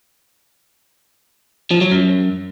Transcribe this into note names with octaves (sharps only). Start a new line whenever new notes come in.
F3
F#3
F#2